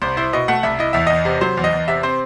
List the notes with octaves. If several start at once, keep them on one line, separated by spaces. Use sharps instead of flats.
C2 C5
E4 C5
B2 D#5
A3 F#5
C2 E5
E4 D#5
E2 E5
E2 D#5
C3
F#3 C5
E2
D#5
E2
C3 E5
C4 C5